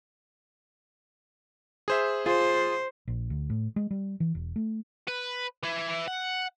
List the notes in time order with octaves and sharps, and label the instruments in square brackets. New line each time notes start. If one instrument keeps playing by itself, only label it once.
[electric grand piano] G#4 C5 E5
[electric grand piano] F4 G#4 [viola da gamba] C5
[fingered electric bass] A#1
D2
A2
G#3
G3
E3
E1
A3
[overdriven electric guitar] B4
E3 E4
F#5